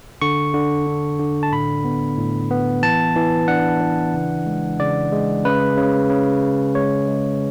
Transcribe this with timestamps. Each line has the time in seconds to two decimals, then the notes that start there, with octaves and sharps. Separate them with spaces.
0.22 D3 C#6
0.54 D3
0.87 D4
1.19 D3
1.43 A5
1.52 A2 B5
1.85 B3
2.18 A2
2.51 B3
2.83 E3 A5
3.16 E3
3.48 D4 F#5
3.81 E3
4.14 C#3
4.46 G#3
4.79 C#3 D5
5.12 G#3
5.45 C#3 B4
5.77 C#3
6.10 C#3
6.43 C#3
6.75 G#3 C#5
7.08 G#3